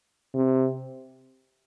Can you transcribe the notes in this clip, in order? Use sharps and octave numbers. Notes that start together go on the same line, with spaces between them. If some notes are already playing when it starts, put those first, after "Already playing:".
C3